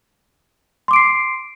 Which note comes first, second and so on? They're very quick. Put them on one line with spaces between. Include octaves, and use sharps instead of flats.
C6 D6 D7 C7